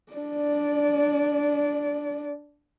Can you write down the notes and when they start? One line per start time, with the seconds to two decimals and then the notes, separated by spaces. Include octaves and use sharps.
0.13 D4 D5